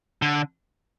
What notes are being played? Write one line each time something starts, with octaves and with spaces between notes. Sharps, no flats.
D3